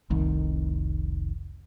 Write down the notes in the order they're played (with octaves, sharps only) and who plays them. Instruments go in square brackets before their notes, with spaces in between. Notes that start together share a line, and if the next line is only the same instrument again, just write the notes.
[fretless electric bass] F1 C2 D#3